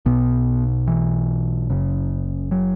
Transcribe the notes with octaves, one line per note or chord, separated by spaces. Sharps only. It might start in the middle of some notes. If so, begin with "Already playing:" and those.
B1 B2 B3
E3
F#1 F#2 C#3
F#3